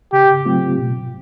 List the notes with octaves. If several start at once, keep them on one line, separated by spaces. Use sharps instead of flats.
C#3 G4
F#3 A3 C4 F4
B2